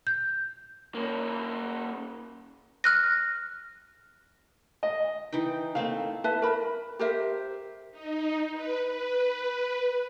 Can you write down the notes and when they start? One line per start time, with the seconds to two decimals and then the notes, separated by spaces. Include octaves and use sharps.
0.07 G6
0.95 A#3 C#4
2.84 F6 F#6 A#6
4.83 D#5
5.33 E3 D#4 G5
5.75 A3 A#3 C4 F5
6.24 E4 B4 E5 A5
6.42 A#4 B5
6.99 G4 A#4 C5 E5
7.91 D#4
8.52 B4
8.87 B4